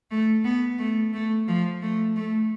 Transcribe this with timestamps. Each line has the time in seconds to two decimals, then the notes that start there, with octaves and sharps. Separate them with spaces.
0.11 A3
0.45 B3
0.79 A3
1.14 A3
1.48 F3
1.82 A3
2.16 A3